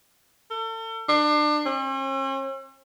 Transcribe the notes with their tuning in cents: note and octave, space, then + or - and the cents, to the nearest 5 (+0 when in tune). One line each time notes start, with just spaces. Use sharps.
A4 +40
D4 +30
C#4 -45